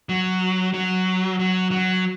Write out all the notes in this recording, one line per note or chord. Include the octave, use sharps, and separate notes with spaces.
F#3
F#3
F#3
F#3